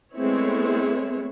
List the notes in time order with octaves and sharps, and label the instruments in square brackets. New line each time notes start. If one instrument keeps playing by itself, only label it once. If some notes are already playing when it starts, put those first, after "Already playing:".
[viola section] G#3 A3 B3 C4 E4 C#5